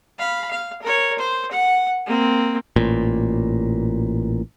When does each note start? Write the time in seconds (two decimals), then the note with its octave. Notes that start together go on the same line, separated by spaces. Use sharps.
0.19 F5 B5
0.50 F5
0.82 A#4 C#5
1.18 C5
1.51 F#5
2.06 A#3 C4
2.76 A1 A#2